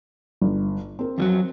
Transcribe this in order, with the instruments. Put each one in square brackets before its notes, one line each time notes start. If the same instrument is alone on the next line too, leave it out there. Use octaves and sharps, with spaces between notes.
[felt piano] G1
C4 A#4
[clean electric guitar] F2 F3 F#3